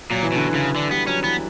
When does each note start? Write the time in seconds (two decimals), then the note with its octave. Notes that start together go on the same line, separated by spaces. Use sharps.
0.10 A#2 F#3
0.23 E3
0.32 B2 D3
0.48 E3
0.54 C#3
0.76 D3
0.91 G3 B3
1.07 F#3 C#4
1.24 E3 B3